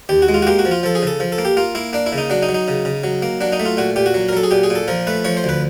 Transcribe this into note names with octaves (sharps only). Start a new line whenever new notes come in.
D#2 G4
F#4
G#3
F4
F#4
A#3 G4
F#4
F3
F4
F3 A4
G#4
C#3 A4
F3
A4
A#3
G4
A#3 F4
A#3 E4
A#3 D4
E4
C#3
D#4
F#3 D4
D#4
F#3
D#4
C#3
C#3
F#3
A#3
F#3 D4
D#4
A3
F4
A#2 F#4
A#2 G4
F#4
F#3
A#4
F#3 A4
G#4
A#2 G4
G#4
A#2
A4
F3 A#4
A3 B4
F3 C#5
C5
D2 B4